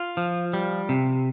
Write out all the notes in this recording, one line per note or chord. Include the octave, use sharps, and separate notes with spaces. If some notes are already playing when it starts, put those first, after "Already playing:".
Already playing: F4
F3
G3
C3